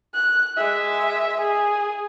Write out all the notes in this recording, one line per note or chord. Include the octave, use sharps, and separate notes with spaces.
F#6
G#3 E5
G#4